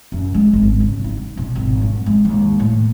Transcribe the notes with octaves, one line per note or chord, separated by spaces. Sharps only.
F#2
G#3
G#1
C#3
D#4
B2
G#1
G2
G#3
D#2
A2